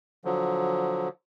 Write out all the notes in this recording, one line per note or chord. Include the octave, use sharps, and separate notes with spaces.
D3 F3 F#3